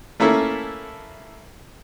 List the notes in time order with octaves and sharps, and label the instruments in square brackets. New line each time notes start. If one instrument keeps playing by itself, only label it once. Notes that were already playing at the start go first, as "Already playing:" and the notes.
[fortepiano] A3 A#3 C#4 E4 A4